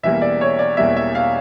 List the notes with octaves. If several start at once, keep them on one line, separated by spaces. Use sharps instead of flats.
E1 E2 E3 G3 A#3 E5
D5
C#5
D5
E1 E2 E3 G3 A#3 E5
E5
F5